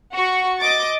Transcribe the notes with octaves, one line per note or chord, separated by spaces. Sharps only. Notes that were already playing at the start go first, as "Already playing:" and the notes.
F#4 C#6
D#5 D6 A6